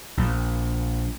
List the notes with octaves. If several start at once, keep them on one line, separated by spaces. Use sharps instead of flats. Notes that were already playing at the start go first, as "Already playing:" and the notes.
A#1